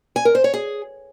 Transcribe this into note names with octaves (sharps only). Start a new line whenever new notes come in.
G#5
A#4
C5
C#5
G#4